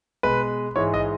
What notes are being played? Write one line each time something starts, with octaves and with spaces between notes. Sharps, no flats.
B2 G#3 B4
G#2 E3 G#3 C#5
D#5